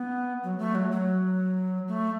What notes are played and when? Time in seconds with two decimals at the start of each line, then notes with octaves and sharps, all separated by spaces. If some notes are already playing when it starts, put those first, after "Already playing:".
Already playing: B3
0.43 F#3
0.59 A3
0.75 F#3
0.92 F#3
1.88 A3